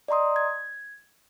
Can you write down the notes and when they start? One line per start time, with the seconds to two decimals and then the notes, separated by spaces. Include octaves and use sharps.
0.08 D5 D#5 A#5 C6 D#6
0.36 G#6